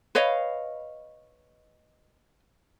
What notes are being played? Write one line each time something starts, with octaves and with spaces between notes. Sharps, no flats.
B4 C#5 D#5 F5